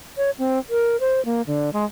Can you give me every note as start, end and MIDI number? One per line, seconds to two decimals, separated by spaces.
0.17 0.31 73
0.38 0.59 60
0.70 0.97 70
1.00 1.23 72
1.25 1.42 58
1.47 1.70 50
1.73 1.84 56